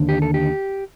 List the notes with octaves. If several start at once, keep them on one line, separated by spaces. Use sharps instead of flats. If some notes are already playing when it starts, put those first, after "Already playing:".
Already playing: D#2 D3
G4
A4
G4